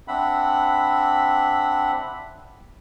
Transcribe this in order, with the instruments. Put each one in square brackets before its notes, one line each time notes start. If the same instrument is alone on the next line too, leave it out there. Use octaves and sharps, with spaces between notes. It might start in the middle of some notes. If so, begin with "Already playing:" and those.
[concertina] C4 D4 E5 F#5 B5